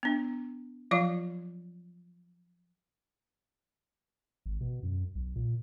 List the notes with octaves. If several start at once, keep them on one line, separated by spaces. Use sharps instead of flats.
B3 D4
F3 F#3 F4 D5 F5
G#1
B2
F#2
B1
A#2